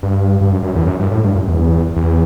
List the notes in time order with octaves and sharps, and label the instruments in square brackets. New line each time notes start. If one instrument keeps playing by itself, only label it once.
[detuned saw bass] G2
G2
F#2
F#2
E2
F#2
G2
A2
G2
F#2
E2
E2